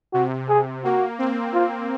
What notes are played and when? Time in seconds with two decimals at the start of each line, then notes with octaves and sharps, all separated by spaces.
0.13 C3 F#4
0.49 G#4
0.84 A#3 F#4
1.19 C4
1.54 F4